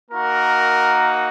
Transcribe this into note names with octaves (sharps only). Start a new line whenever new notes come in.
A#3 D#4 F#4 A#4